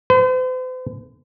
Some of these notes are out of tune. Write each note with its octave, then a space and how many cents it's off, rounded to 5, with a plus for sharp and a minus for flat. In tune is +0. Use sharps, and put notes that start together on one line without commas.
C5 -45